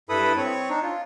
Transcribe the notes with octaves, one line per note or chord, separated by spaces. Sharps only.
G2 E4 A4 B4 B5 D#6
C4 C#5
D4 D#4
F4